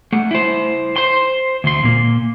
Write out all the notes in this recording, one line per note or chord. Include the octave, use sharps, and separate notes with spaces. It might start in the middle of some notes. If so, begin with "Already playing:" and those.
A3 F#5
E4 C5
C5 C6
D2 C6
A#2 A#3